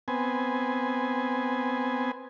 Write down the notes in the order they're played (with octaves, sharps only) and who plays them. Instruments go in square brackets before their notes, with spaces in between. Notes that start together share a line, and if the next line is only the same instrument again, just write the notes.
[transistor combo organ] B3 C4 G#5